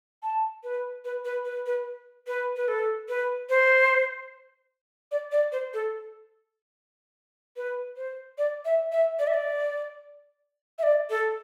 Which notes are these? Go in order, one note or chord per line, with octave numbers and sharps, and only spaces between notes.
A5
B4
B4
B4
B4
B4
B4
B4
A4
B4
C5
D5
D5
C5
A4
B4
C5
D5
E5
E5
D5
E5
D5
E5
D5
A4